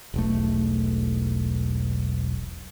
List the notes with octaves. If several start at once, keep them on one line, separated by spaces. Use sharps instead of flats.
E1 B1 A3